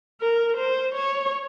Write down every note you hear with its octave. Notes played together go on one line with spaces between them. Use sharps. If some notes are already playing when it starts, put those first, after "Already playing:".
A#4
C5
C#5